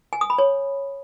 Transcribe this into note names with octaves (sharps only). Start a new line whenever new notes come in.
G#5
D#6
B5
C#5